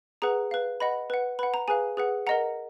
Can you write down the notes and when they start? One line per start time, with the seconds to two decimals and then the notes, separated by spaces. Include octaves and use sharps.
0.22 G#4 B4 F#5 A#5
0.51 B4 F5
0.80 B4 D#5 F#5 B5
1.10 B4 F#5
1.39 B4 F#5 B5
1.54 A#5
1.68 G#4 B4 F5 G#5
1.97 G#4 B4 F#5
2.27 A#4 D#5 F#5 A#5